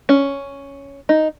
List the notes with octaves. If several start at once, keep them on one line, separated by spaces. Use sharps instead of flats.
C#4
D#4